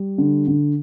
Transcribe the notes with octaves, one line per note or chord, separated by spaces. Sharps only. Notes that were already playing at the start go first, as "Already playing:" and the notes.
Already playing: G3
D3
D3